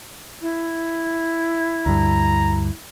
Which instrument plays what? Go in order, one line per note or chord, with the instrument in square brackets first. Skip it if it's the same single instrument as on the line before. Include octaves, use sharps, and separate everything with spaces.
[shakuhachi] E4
[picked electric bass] D2 G2 [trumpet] A#5